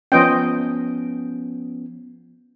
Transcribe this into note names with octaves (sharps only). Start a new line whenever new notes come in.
F3 B3 C#4 C5 D#5 G5